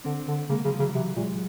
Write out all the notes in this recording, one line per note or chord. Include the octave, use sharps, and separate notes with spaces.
D3 C4 D4
D3
C#3 G#3 A#3
C#3 F#3 G#3
F3
C#3 E3 F#3
C3 E3 F#3
A#2 F#3 G#3